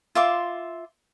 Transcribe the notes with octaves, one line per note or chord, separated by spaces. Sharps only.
F4 E5 C6 D6